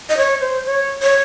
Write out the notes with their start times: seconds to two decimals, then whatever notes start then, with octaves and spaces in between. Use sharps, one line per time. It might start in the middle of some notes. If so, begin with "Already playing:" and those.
0.09 D#5
0.17 C#5
0.41 C5
0.66 C#5
1.03 C#5